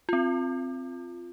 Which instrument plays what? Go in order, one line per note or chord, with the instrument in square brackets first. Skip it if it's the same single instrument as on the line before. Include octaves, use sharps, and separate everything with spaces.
[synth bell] C4 F4